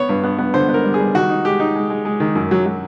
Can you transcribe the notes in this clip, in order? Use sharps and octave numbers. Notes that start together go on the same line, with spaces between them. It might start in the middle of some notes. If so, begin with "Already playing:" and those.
Already playing: B3 C#5
G2
B3
B3
D3 C5
B3
A#4
G3
G#4
G3
D#3 F#4
D#4
G#3 G4
D#4
G#3
G#3
G#3
D#3
F#2
F#3
F#3